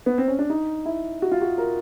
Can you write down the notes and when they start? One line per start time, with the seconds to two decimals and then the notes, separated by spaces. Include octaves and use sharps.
0.06 B3
0.18 C4
0.28 C#4
0.39 D4
0.50 D#4
0.86 E4
1.22 F#4
1.32 F4
1.41 F#4
1.58 A#4